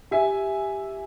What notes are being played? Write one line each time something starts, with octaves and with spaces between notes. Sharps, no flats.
G4 E5 G#5